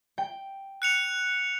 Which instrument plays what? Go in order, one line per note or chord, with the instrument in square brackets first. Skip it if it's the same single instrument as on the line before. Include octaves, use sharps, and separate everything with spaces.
[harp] G5
[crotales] F#6 C#7 F7